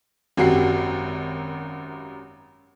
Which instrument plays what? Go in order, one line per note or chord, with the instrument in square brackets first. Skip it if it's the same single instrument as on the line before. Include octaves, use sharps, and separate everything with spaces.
[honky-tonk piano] G#1 F#2 F#4 G4 C7